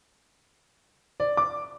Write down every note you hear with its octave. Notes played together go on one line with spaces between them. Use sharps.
D5
D6